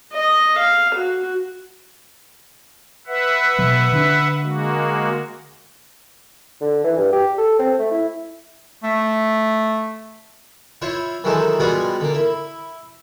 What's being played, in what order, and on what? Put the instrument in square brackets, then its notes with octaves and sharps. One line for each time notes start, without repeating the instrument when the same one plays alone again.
[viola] D#5
F5
F#4
[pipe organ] B4 E5 F#5
[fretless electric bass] B2 F#3
D3 C#4 D4
[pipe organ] G#3 A#3 F#4
[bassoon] D3
E3
G2
G4
A4
C4
A3
E4
[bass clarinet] A3
[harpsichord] E4 F4 C5 C#5
D#3 E3 F#3 G#3 A4 C5
G3 G#3 B3 F4 F#4 G#4
D3 A#3
E4